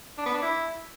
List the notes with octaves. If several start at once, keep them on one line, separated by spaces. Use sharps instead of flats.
D4
B3
D4
E4